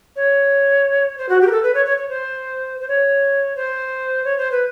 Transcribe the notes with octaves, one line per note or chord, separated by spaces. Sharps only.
C#5
C5
F#4
G4
A#4
A4
B4
C#5
C#5
C#5
C5
C5
C#5
C5
C#5
C5
B4